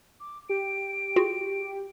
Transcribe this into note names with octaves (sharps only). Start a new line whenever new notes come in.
D6
G4 D7
F4 F#4 G#4